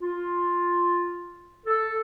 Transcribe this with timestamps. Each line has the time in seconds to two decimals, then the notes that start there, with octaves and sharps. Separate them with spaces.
0.02 F4
1.65 A4